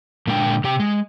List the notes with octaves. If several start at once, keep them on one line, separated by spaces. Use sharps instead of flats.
A#2 D3 G#3 D4 C5 G5
C3 G4 G5
G#3